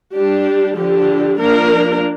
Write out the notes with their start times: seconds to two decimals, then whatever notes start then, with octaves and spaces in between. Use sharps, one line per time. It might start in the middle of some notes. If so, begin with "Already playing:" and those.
0.14 G3 D4 G4
0.77 D3 F3 D4 G4
1.39 F3 A#3 D4 A#4